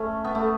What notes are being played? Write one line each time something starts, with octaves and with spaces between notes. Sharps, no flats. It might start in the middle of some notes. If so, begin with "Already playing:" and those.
Already playing: A3 C#4
B3
A3